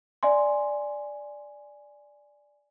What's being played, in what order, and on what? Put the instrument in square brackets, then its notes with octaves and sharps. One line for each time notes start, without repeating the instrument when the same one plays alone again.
[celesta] D5 E5 G#5 C6